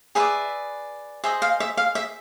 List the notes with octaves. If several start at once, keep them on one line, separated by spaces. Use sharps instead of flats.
G#4 B4 D5 E5
G#4 C5 D#5 E5
F5
E5
F5
E5